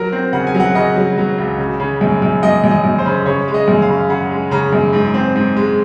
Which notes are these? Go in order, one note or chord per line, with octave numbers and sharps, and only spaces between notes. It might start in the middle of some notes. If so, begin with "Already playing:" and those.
Already playing: F#3 A#4
C4
C#3 F#5
G#5
F#3
F#5
C#3 D#5
F#3
F#3
C#2
C#3
C#3
F#2
F#2
F#2 D#5
F#2
D#5
F#2
C5
C#3
C#3 C#5
G#3
D#5
F#2
F5
C#3
C#3 F#5
G#3
C#3 A#5
F#2
G#2
C4
G#2
G#3